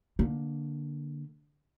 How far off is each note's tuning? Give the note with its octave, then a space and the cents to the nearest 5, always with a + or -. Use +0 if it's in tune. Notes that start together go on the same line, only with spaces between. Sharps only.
D3 +0 A#3 +10